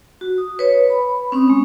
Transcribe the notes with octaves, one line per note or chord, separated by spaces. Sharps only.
F#4
D#6
B4 C#5
B5
C4 C#4 C#6 D#6
G#3 C4